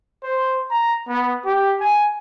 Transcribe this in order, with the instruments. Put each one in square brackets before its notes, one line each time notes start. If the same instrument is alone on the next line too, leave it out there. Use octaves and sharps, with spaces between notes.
[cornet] C5
A#5
B3
G4
G#5